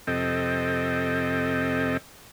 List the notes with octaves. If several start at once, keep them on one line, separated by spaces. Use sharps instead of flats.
F2 C3 C4 A4 D#5 G5